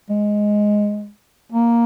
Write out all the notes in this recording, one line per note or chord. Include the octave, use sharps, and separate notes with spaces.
G#3
A#3